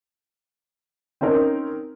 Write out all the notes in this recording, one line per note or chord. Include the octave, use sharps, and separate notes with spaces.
C4 C#4 D#4 A#4